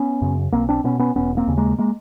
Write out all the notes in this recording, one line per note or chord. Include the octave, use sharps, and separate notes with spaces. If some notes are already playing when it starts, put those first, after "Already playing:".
Already playing: B3 C#4
F#2 C#3
B1 A#3 C4
C4 D4
B2 B3 C#4
B3 C#4
E1 B3 C#4
A#3 C4
D#2 C#3
G#3 A#3
G#3 A#3